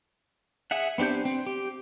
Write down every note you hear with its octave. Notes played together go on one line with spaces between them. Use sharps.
G#4 E5 F#5
B3 C4 D4 G4 G6
C4
G4